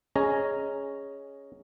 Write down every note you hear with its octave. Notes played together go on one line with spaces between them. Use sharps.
C#4 G#4 D#5 A#5